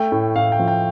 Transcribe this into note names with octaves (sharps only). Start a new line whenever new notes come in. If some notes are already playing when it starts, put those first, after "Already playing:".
Already playing: A3 G5
A2
A2 F5
G5
F3
G5